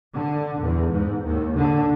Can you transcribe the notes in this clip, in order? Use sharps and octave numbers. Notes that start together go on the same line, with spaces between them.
D3
E2
G#2
D#2
D3